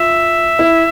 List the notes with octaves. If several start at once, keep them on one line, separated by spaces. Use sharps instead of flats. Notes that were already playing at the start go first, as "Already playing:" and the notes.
Already playing: F4 E5
E4